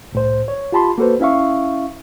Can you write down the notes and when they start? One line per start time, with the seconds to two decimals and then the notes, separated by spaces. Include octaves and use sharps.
0.12 C2 A2 C5
0.48 C#5
0.72 F4 G4 A5 B5 C6
0.98 A#3 F#4 A4 B4 C5
1.20 C#4 E4 E5 F5 C#6